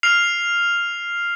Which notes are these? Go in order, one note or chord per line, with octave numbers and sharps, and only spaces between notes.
F6 C7 F7